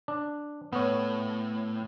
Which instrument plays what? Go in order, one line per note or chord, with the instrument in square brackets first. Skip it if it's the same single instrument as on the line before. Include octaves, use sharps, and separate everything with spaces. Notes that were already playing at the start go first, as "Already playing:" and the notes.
[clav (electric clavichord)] D4
[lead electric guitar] A2 [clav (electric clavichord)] B3 C#5